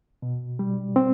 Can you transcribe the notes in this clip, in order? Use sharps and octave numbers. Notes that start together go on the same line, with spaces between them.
B2
G3
C4